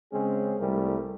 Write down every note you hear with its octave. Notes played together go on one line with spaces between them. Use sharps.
C#3 G#3 C4 C#4 G#4
C2 G3 A3 A#4